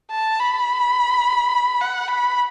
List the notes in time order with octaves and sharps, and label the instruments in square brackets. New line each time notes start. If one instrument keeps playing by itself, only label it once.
[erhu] A5
B5
F#5
B5